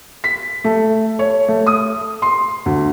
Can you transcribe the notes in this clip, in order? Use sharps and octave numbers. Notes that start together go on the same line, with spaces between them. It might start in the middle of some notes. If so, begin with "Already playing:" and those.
B6
A3
C#5
A3
D#6
C6
D2